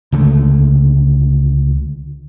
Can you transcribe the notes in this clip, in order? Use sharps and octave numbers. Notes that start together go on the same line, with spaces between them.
C#2 D3 A3